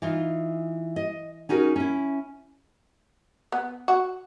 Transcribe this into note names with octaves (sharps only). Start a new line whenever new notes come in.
E3 D#4 F4
D#5
C#4 D#4 F#4 G#4 A#4
C#4 E4
B3
F#4